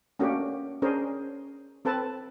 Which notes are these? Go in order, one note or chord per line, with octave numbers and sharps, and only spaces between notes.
A3 A#3 C#4 D4 F#4 G4
C#4 D4 G#4 A#4 C5
C4 A4 B4 A5